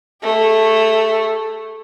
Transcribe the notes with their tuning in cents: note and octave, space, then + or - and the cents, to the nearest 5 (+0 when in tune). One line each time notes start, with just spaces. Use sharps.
A3 +0 G#4 -40